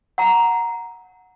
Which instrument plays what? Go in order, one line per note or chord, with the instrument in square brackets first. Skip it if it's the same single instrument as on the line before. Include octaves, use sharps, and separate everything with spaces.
[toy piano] F#5 A#5